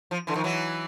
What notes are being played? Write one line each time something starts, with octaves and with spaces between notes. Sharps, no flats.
F3
D3 E3
D#3 F3
E3 F#3